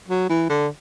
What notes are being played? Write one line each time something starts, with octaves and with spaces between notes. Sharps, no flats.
F#3
E3
D3